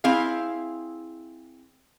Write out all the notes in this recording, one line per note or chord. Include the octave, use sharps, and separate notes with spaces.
C4 E4 G#4 F5